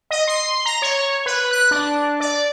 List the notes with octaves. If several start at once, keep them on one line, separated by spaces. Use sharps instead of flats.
D#5
C6
A#5
C#5
B4
F#6
D4
D5